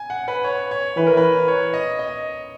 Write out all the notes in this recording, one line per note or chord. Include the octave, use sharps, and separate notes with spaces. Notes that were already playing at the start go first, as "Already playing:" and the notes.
Already playing: G#5
F#5
B4
C#5
C#5
E3 B4
A#4
B4
C#5
D#5
D#5